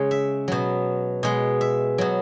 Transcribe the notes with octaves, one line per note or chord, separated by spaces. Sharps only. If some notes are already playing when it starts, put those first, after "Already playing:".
Already playing: C#3 G#3 C#5
E5
B2 F#3
B2 G#3
E5
B2 F#3